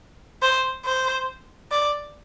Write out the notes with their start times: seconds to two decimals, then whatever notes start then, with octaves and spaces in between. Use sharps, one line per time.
0.42 C5
0.85 C5
1.72 D5